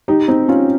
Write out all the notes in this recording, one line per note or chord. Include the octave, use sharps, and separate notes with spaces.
D#4 G4
C4 D#4
C#4 F4